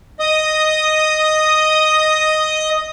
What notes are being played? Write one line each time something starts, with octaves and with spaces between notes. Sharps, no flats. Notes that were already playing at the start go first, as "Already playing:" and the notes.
D#5 D#6